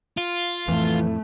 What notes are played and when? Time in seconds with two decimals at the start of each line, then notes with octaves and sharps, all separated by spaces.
0.18 F4
0.68 F2 A2 E3 A3